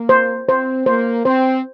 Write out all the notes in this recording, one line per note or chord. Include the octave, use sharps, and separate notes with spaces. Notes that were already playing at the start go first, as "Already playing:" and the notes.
Already playing: A#3
C5
C4 C5
A#3 C5
C4 C5